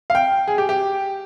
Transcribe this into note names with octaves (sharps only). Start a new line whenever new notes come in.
F5
G5
G#4
G4
G4